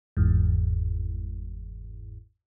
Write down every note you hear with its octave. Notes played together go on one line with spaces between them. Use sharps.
G1 E2 G#2